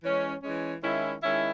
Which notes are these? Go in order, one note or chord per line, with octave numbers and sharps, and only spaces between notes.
E3 G#3 C#4
E3 G#3 C#4
D#3 G#3 C#4 E4
D#3 G#3 C#4 E4